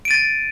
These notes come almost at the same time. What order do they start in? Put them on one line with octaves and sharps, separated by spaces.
D7 D#7 A6